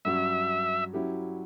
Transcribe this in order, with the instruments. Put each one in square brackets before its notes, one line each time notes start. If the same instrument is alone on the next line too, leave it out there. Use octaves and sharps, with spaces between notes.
[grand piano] G2 F#3 C#4 F#4 [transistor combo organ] E5
[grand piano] F#3 C#4 E4 G4